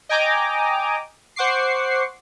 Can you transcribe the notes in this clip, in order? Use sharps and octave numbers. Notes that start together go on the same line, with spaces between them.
D#5 G5 G#5 A#5 D6
C5 F#5 C#6 D6 C7